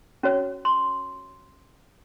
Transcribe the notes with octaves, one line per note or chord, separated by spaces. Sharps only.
C#4 F#4 C#5
C6